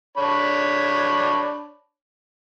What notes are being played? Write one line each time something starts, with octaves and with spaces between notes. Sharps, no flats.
D4 C#5 B5